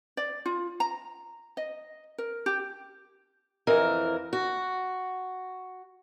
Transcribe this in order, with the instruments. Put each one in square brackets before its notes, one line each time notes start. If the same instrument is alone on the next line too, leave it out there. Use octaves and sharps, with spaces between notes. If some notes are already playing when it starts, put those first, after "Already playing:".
[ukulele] D5
F4
A#5
D#5
A#4
G4
[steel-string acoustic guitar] F2 E3 A#4
F#4